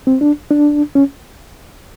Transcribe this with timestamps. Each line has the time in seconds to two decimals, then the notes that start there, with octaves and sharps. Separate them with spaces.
0.07 C4
0.21 D4
0.51 D4
0.95 C#4